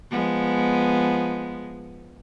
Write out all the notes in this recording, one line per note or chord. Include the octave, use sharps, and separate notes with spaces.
F3 G#3 B3